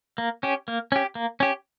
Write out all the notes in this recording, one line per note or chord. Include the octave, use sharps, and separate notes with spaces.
A#3
C#4 G4
A#3
C#4 G4
A#3
C#4 G4